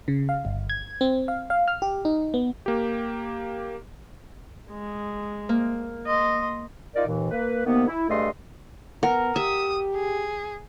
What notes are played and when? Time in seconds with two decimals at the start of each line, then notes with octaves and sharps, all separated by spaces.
0.08 C#3
0.29 F5
0.45 G1
0.70 G#6
1.01 C4
1.28 F5
1.50 F5
1.68 F6
1.82 G4
2.05 D#4
2.34 B3
2.66 A#3 G4
4.71 G#3
5.49 A#3
6.07 D#5 C6
6.96 D#4 F4 A#4 D5
7.07 D#2 A#2 E3
7.31 A#3 B4
7.66 C3 D#3 A#3 B3
7.88 E4
8.09 G2 G#3 A3 A4 D#5 C6
9.03 B3 A#4 F#5
9.36 G4 E5 D#6
9.95 G#4